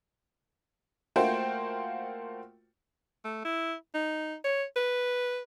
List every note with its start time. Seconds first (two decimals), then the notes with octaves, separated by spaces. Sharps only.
1.16 A3 A#3 F4 F#4 C5 G5
3.24 A3
3.44 E4
3.94 D#4
4.44 C#5
4.76 B4